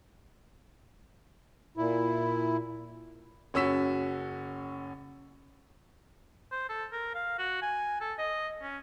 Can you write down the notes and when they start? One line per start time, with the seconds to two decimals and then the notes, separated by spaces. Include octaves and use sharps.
1.77 A#2 E4
3.54 F#1 C#4 F#4 E6 B6 E7
6.52 C5
6.69 A4
6.92 A#4
7.14 F5
7.39 F#4
7.62 G#5
8.01 A4
8.18 D#5
8.62 C#4